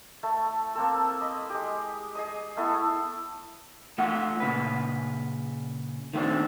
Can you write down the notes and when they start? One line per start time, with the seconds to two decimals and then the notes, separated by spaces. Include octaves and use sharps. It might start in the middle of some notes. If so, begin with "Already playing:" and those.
0.23 A3 A5
0.75 A#3 C4 A4
1.20 D#5 B5
1.50 G#3 G4
2.15 G#4 D#5 D#6
2.57 A3 B3 E4 A4
3.98 A3 F4 F#5
4.40 A#2 C#3 B4
6.13 D#3 A3 B3 C4 D4